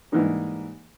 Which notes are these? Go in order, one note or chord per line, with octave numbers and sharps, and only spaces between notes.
G#2 E3 G3 A#3 D#4 G4